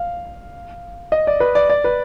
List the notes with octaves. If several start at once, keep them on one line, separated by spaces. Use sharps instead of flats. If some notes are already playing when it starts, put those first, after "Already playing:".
Already playing: F5
D#5
D5
B4
D5
D5
B4